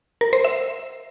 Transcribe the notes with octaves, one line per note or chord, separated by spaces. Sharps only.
A#4
C5
E5